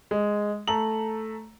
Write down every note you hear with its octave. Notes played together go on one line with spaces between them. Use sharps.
G#3
A3 A4 A#5 F#7